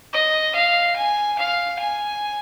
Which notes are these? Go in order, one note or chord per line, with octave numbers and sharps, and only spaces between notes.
D#5
F5
G#5
F5
G#5